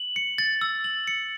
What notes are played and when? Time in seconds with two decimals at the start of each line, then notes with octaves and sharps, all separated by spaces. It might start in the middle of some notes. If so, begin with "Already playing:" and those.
Already playing: F#7
0.16 C#7
0.38 A6
0.61 E6
0.84 F#7
1.07 C#7